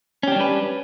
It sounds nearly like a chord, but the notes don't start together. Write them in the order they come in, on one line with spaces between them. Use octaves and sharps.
C#4 G4 D4 G3 B4